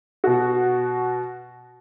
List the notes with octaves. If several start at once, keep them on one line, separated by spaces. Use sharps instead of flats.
B2 F#4